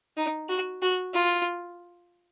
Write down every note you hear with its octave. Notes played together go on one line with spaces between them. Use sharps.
D#4
F#4
F#4
F4